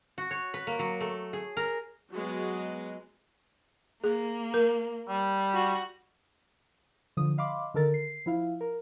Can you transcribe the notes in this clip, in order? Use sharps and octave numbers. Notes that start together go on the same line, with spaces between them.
F#4
C#5
B4
A#3
F#3
A3
G#4
A#4
F#3 G#3 B3
A#3 G#4
A#4
G3
F#4
D3 F3 D#6
D#5 F5 B5 C6 D6
D3 D#3 A4 A#4 A6
C7
F3 E4 F5
A#4